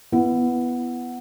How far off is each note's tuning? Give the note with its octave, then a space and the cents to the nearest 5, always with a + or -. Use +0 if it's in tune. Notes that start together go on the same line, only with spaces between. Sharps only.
B3 +0 E4 +25